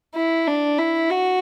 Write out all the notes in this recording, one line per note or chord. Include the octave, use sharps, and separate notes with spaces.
E4
D4
E4
F#4